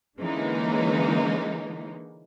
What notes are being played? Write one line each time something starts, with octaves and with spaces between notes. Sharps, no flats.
D3 E3 G#3 A#3 C#4 D#4